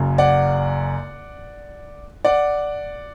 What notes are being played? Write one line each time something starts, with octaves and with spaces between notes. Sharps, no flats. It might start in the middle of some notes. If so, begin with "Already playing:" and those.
Already playing: F#1 F#2 C#3
D5 F#5
D5 F#5